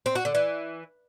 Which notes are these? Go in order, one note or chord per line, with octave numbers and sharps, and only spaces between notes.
C4
F#4
D3
E3